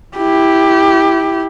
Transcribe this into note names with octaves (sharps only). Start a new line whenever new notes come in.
E4 G4